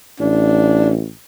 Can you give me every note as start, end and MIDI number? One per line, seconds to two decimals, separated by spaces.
0.20 1.07 33
0.20 0.91 62